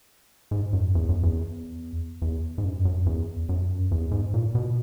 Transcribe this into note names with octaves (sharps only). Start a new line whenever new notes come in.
G#2
F#2
E2
F#2
E2
E2
G#2
F#2
F#2
E2
F#2
E2
G#2
A#2
B2